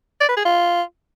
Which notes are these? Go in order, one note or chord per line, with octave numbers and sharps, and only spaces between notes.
D5
B4
G#4
F4